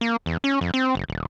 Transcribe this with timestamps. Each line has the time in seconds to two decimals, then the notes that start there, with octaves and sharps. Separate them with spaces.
0.01 A#3
0.26 E2
0.44 C#4
0.61 F2
0.74 C4
0.95 F#1
1.08 D#1